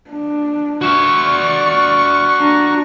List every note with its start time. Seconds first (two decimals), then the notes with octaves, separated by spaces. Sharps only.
0.11 D4
0.81 F#4 E5 C#6
1.26 D5
2.40 D4 A#5